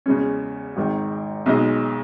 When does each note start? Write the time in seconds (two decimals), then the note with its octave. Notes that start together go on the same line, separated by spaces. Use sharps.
0.06 E2 C#3 G#3 C#4
0.76 G#1 G#2 D#3
1.46 B1 B2 G#3 D#4